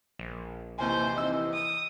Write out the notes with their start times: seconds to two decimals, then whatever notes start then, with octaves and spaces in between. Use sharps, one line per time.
0.19 A#1
0.78 D#2 C3 E3 C5 G#5
1.16 D#4 E6
1.54 D#6